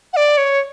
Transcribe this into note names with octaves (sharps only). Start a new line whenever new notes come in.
F#5
D5
C#5